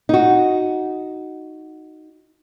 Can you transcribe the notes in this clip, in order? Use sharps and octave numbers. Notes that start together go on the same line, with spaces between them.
D#4 F#4